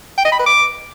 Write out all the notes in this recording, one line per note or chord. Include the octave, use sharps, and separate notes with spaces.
G5
D#5
B5
B4
D6